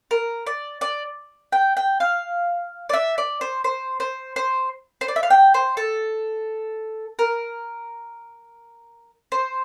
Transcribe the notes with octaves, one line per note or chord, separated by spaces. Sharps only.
A#4
D5
D5
G5
G5
F5
D5
E5
D5
C5
C5
C5
C5
C5
D5
E5
F5
G5
C5
A4
A#4
C5